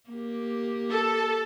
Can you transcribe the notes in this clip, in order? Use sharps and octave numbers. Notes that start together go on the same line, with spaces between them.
A#3 G4
A4